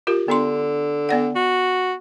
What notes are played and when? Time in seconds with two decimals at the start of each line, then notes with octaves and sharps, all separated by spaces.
0.07 F4 G4 A#4
0.28 D3 B3 D4 C6
1.09 B3 D5 F#5
1.35 F#4